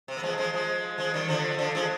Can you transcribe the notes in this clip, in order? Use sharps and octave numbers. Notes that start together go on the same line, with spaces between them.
C3
B3
F3 G#3
F3 G#3
F3 G#3
F3 G#3
D#3 G3
D3 F3
D3 F3
F3 G#3